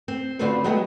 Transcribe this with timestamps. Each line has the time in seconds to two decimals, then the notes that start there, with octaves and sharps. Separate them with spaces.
0.08 C4
0.39 D3 A3 C4 F4 F#4 B4
0.64 F#3 G#3 A3 B3 G4